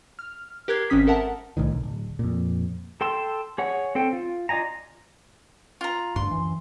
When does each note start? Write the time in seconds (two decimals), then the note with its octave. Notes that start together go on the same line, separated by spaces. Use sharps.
0.19 F6
0.68 G4 A#4 F#6 G#6 C7
0.90 G#1 D#3 C4 C#4 D#6 B6
1.07 A4 A#4 E5 F#5 A5
1.57 C2 A2 D#3
1.72 B1
1.83 D1
2.19 F2 A#2
3.01 A4 G5 C6 E6
3.58 G#4 C#5 F#5
3.95 C4 A4 G5
4.13 F4
4.49 F4 D5 D#5 G#5 A#5
5.81 F4 A#5
6.16 D2 G2 C6
6.31 F#2 E3